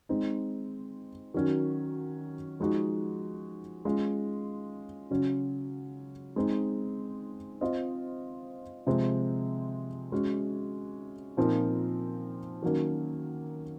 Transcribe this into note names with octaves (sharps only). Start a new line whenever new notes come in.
G#3 C4 D#4
D#3 F#3 C#4 F#4 A#4
F3 G#3 D#4 F#4
G#3 C#4 F4
C#3 F#3 C#4
G#3 C4 D#4
C4 F4 C5 D#5
C3 F3 G#3 C4
G#3 C#4 F#4
A#2 F3 C4 D#4 A#4
D#3 F#3 A#3 C#4